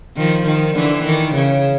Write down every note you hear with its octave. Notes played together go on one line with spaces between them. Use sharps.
D#3 F3
D#3
D3 E3
D#3
C#3